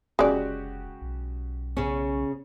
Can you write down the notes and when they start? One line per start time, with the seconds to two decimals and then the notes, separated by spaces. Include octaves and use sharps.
0.19 F1 C#3 G#3 F#4 G4 D5
1.02 B1
1.77 C#3 C#4